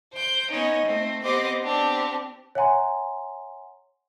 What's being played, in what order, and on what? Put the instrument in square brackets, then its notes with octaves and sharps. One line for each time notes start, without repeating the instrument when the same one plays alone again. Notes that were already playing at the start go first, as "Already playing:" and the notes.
[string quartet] C5 G5 G6
B3 C#4 D#4 D#5
A3 C4
B3 C4 G4 C5 D#5 D6
B3 C4 D4 G4
[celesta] C#5 E5 F#5 G#5 A#5 C6